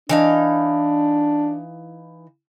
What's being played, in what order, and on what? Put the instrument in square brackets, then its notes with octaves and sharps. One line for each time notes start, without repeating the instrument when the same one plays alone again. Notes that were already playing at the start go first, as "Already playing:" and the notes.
[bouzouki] E3 D#4 F5 [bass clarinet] D4